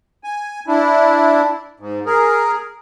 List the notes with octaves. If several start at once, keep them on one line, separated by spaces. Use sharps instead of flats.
G#5
D4 E4
G#2
G#4 A#4